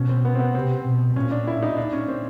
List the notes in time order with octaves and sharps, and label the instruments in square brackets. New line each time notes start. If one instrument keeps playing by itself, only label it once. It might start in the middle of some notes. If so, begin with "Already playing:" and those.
Already playing: [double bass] B2 [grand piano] C#4
[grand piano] C4
B3
C4
B3
[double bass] C3 [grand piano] C4
[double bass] B2
[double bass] A#2 [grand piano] C#4
[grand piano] D4
E4
D#4
D4
C#4
C4